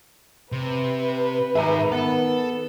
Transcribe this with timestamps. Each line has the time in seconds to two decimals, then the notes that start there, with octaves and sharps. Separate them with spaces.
0.52 C3 B4
1.55 G#2 D#3 G#4 E5 A#5
1.92 B3 A4